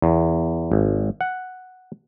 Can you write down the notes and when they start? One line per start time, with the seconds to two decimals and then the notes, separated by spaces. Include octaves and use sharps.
0.02 E2
0.72 G#1
1.21 F#5